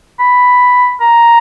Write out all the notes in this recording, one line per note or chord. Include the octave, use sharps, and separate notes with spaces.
B5
A#5